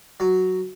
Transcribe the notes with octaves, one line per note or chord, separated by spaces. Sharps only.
F#3